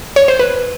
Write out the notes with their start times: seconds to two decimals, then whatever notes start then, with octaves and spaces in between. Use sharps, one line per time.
0.16 C#5
0.28 C5
0.39 B4